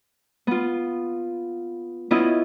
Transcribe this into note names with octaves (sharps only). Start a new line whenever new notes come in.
B3 F4
B3 C#4 E4 F4 D#5